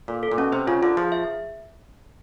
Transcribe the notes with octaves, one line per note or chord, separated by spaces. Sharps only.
A#2 A4
A4
A#2
B2 C#4
C3 C5
C#3 F4
D3 F4
F3 G#4
E5